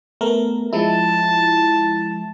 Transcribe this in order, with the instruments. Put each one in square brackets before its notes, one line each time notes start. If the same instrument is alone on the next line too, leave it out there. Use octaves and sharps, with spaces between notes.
[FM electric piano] A3 B3 A#4
[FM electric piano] F3 G#3 E4 [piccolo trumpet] A5